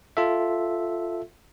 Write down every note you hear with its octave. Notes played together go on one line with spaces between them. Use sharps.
F4 A4 E5